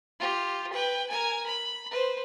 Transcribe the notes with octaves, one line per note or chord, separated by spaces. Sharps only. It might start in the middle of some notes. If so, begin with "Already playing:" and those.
F4 G4
B4 G5
A#4 G#5
B5
B4 C5